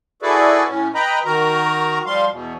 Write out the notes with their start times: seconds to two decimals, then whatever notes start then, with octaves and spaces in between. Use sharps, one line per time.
0.22 E4 F#4 G#4 A4 B4 D5
0.68 A2 C#4
0.95 B4 D#5 G5 A#5 B5
1.25 D#3 F#4 A#4 A#5
2.06 F3 G3 F5 C6
2.31 E2 B2